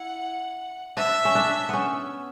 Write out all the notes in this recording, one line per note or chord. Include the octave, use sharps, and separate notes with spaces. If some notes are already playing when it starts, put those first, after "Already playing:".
Already playing: E4 F#5
D4 E5
C#4
D4
B3 C#4